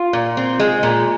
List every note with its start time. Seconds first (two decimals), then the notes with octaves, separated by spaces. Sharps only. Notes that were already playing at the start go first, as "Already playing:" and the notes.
Already playing: F4
0.13 A#2
0.37 C4
0.60 G#3
0.83 A#2